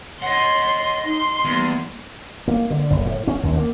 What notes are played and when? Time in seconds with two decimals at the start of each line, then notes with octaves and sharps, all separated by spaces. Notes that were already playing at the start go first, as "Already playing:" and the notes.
0.22 C#5 D#5 F#5 C6
1.05 D#4 C6
1.44 E2 G3 A#3
2.48 A#3
2.70 D3
2.90 F#1
3.05 A2
3.27 C#4
3.43 D#2
3.57 A#3